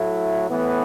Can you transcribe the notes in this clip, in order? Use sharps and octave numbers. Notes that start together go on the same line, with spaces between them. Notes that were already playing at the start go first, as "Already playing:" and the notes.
Already playing: A2 F#3 A3 E4
A2 E3 B3